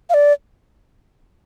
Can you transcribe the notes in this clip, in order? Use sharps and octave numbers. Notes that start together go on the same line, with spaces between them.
F5
D5